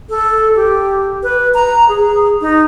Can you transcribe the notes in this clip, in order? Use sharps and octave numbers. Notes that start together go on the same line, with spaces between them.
A4
G4
B4
A#5
G#4
D#4